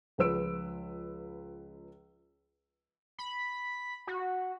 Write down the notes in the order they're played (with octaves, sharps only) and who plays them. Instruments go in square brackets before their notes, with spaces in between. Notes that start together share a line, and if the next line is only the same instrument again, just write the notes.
[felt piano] C#2 F3 B4 E6 D7
[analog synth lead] B5
F#4